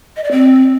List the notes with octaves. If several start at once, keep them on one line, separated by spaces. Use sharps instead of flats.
D#5
D5
C4